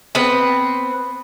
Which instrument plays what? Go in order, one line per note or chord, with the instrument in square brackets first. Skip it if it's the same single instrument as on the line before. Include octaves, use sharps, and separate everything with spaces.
[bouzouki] B3 C4 B4